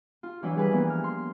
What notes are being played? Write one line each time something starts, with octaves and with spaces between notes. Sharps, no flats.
F4
E3 F#3 D4 E4 F4
G3 G#4 B4
E3 F3 A#3 B3
F6
C6